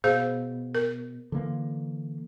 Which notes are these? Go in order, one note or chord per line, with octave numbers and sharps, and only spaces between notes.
B2 G#4 C5 F5
A#4
D3 E3 A#3